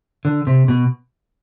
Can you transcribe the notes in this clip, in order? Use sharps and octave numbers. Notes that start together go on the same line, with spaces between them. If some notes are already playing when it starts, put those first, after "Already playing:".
D3
C3
B2